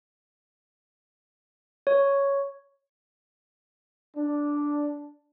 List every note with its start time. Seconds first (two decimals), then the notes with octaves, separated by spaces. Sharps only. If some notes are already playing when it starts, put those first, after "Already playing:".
1.87 C#5
4.17 D4